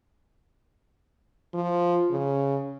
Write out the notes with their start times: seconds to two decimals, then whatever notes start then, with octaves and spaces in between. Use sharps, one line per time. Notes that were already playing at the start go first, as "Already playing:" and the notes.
1.54 F3
2.11 C#3